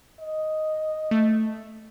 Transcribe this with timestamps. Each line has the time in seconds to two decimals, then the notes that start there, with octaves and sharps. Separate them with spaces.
0.20 D#5
1.11 A3